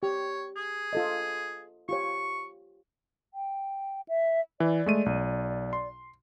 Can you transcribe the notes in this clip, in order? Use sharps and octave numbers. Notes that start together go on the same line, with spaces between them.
G4 C#5
G#4
F4 A4 D#5
F4 G4 C#5 C#6
G5
E5
E3 D5
G#3 A3 D#7
B1
C6